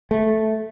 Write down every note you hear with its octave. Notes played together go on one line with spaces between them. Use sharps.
A3